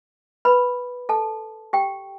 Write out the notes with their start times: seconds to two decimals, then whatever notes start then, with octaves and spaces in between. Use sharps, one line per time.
0.45 B4 B5
1.09 A4 A5
1.73 G4 G5